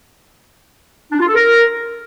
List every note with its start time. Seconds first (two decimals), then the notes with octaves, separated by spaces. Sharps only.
1.12 D4
1.20 F4
1.27 A4
1.35 A#4